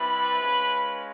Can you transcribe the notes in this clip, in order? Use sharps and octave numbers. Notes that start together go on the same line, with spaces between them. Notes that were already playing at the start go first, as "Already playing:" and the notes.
Already playing: G3 C4 E4 B4 B5
G#3 C#4 F4